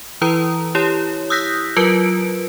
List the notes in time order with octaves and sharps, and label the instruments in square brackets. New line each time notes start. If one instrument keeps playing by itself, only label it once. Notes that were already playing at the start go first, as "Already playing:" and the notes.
[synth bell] E3 E4 B4 A#5 D#6
E4 G4 C#5
D#6 E6 F#6 G6 A#6 B6
F#3 F4 A#4 B4 D7